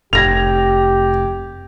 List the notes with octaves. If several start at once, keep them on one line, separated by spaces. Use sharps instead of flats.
F1 G4 G#6 A#6 F7